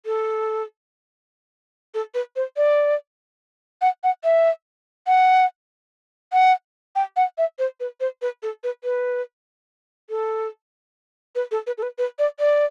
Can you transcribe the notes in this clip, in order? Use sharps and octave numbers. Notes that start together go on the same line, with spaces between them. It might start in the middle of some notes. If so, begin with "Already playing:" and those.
A4
A4
B4
C5
D5
F#5
F#5
E5
F#5
F#5
G5
F#5
E5
C5
B4
C5
B4
A4
B4
B4
A4
B4
A4
B4
A4
B4
B4
D5
D5